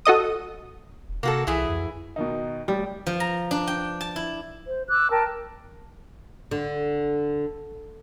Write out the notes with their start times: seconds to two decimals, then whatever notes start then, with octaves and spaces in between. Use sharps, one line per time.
0.05 F#4 A4 D#5 D#6
1.09 E1
1.23 C3 A#3 F#4 A4
1.47 C2 E3 E4 G#4
1.69 F2
2.16 B2 D#3 D#4
2.68 A1 G3
3.07 F3
3.20 A#5
3.51 D4
3.67 G5
4.01 A5
4.16 E4
4.66 C5
4.88 D6 E6 F#6
5.10 A#4 G5 A5
6.51 D3